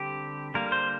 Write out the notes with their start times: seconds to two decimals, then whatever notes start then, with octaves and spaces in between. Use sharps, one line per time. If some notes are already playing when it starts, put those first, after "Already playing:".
Already playing: D3 G3 C4 G4
0.54 D3 G3 A#3 A#4
0.72 C5